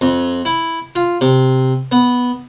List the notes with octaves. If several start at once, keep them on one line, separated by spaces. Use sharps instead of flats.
F2
E4
F4
C3
B3